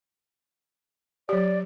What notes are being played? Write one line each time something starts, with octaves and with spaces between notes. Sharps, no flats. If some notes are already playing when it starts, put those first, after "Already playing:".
F#3 G4 D5